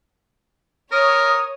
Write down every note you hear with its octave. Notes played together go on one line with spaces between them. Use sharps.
A#4 C#5 D#6